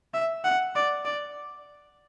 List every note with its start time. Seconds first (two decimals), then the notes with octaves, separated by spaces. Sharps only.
0.14 E5
0.45 F#5
0.75 D5
1.05 D5